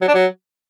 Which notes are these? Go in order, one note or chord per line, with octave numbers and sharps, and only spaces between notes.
F#3
D4
F#3